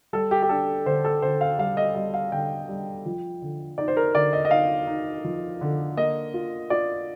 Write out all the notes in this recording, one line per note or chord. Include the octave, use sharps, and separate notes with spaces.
G3 A4
G4
G4
D4 A4
D3 C5
A4
D3 C5
F5
G3 F5
D#5
G3 D#5
F5
D3 G5
G3
F3
D3
D#4 D5
C5
A#4
D3 D5
D#5
D#5
D#4 F5
D#4
F3
D3
A#3 D#5
F4
F4 D5